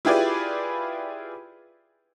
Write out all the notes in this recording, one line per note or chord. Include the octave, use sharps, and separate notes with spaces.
E4 F4 G4 G#4 B4 D5